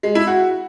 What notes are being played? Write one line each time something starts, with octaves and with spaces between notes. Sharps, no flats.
G#3
E4
F#4